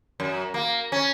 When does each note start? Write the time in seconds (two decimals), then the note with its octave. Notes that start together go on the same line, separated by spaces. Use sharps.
0.20 F#2
0.54 A#3
0.92 C#4